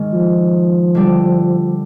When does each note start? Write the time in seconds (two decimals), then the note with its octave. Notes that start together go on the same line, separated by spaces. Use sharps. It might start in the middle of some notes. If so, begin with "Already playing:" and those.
Already playing: G#2 D#3 G#3
0.13 F3
0.95 D3 G3 D4